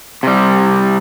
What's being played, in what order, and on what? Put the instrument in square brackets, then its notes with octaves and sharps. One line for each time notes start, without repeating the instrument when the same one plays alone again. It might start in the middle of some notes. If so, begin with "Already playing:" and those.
[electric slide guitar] C3 G3